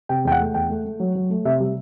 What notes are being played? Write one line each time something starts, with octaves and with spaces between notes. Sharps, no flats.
C3 G5
E2 G5
F#5
A3
E2 G5
A3
A3
F#3
F#3
A3
C3 E5
G3